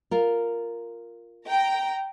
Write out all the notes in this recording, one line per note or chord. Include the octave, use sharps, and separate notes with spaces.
F4 A#4
G5 A#5